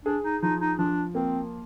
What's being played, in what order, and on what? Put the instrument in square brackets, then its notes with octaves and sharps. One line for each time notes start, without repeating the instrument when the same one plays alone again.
[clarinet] D4 [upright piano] G#4
[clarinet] D#4
[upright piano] F3 [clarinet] D#4
[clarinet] D#4
[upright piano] F3 [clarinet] D4
[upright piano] A#3 [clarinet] C4